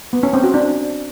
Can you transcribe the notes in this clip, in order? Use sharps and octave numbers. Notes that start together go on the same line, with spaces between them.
B3
C#4
C4
F#4
D4